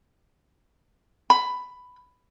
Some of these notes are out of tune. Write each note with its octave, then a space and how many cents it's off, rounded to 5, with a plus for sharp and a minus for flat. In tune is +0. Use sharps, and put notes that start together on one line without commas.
B5 +10